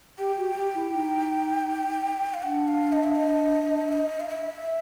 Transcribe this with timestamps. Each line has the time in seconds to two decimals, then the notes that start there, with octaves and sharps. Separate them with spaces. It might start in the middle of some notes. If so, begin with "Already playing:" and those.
0.18 G4 G5
0.37 F#4
0.56 G4
0.74 E4
0.93 D#4
2.34 F5
2.42 D4 F#5
2.68 F5
2.92 D#5
3.04 E5
3.15 D#5
3.89 E5
3.92 D#5
4.20 F5
4.29 E5